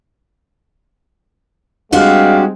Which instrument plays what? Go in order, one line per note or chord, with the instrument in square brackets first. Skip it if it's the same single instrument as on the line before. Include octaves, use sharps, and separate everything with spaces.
[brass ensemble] G3 G#3 C4 [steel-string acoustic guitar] D4 F#4 G4 [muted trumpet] F5